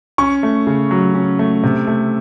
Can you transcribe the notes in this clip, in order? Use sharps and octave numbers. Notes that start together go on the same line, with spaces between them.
C#4 C#6
A3
C#3
F#3
C#4
A3
C3
A3